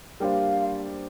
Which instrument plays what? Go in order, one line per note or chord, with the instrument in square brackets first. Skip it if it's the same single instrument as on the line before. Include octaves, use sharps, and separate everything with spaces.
[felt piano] G3 A#3 D4 G4 C5 [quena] F5 G5